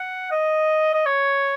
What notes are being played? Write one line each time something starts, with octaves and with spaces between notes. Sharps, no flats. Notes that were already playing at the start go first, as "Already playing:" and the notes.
Already playing: F#5
D#5
D#5
C#5